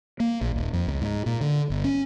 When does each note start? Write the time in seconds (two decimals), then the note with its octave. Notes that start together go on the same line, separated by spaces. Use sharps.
0.20 A#3
0.41 A#1
0.56 D#1
0.73 F2
0.87 C#2
1.01 G#2
1.26 A#2
1.41 D3
1.70 G1
1.84 C#4